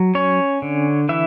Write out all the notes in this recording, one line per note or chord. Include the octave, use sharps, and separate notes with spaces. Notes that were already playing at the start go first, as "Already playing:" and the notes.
Already playing: F#3
C#4 C#5
D3
E3 E5